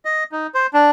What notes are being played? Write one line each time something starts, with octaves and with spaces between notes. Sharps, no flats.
D#5
D#4
C5
D4